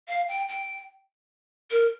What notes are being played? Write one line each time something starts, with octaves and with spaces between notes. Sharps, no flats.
F5
G5
G5
A#4